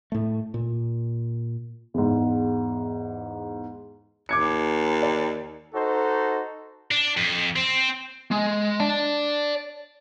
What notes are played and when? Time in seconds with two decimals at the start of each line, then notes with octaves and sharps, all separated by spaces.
0.12 A2 A3
0.54 A#2
1.94 E2 G#2
4.29 D#2 D6 G#6 C#7
5.03 D5
5.73 D#4 F#4 A4 C5
6.91 D4
7.17 F2
7.56 C4
8.31 G#3
8.80 D5 A5